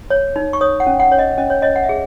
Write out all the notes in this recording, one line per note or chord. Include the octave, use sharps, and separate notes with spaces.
C#5
D#4
C#6
C#5 D#6
F#5
C#4
F#5
C#5
D#5
C#4 D#5
C#5
C#5 D#5
F#5
E5
G#4